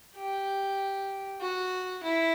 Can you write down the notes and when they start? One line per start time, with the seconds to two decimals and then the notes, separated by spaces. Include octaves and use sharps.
0.15 G4
1.41 F#4
2.04 E4